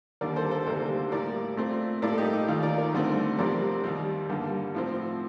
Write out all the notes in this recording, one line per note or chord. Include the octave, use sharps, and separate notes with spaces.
D#2 D3 G3 A#3 A#4 D5
A4 C5
A4 C5
D2 C3 G3 A#3 A4 C5
A2 G3 A#3 A#4 D5
A#2 A3 C4
A2 G3 A#3 A#4 D5
A4
D#4 G4
D#4
D#2 D#3 A#3 F4
A#4 D5
A#4 D5
G2 D3 A3 C4
F2 C3 G3 C4 A#4 D5
D#2 D#3 G3
G2 D3 G3 A#3
A2 F3 C4